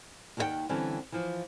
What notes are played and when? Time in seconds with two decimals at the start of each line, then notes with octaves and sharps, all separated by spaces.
0.37 D#2 D#3 F#4 A#4 F#5 G5
0.69 D3 E3 G3 C4 C#4
1.12 E3 F3